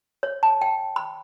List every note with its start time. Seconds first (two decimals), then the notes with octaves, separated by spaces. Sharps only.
0.23 C#5
0.43 A5
0.62 G5
0.96 B5